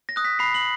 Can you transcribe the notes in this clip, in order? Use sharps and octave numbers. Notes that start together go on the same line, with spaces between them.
A#6
D#6 F#6
B6
B5 C7
F#7